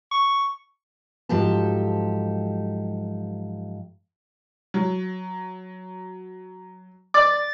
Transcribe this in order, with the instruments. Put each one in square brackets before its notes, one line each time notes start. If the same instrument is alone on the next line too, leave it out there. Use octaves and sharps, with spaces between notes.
[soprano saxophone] C#6
[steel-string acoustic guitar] G#2 F3 F#3 G4 A4 A5
[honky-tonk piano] F#3
[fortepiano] D5 D6 [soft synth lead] A6